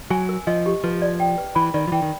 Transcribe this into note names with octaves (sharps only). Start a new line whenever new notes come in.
F#3 G#5
A#4
F3 D#5
G4
F3 B4
D5
G5
B4
E3 B5
D#3 D5
F3
E3 G5
D#3